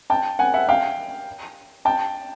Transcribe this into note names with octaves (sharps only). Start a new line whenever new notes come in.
G5 A5
F#5 G#5
E5 F#5
F5 G5
G5 A5